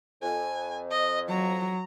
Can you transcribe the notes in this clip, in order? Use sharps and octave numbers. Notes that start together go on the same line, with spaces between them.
F2 G#5
D#5
F#3 A#5